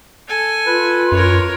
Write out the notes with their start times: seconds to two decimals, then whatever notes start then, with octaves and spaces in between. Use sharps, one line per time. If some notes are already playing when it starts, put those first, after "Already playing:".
0.28 A4 G#5
0.66 F4 B4
1.12 F#2 A#4 C#5